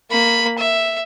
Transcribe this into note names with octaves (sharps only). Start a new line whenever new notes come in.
A#3 B5
E5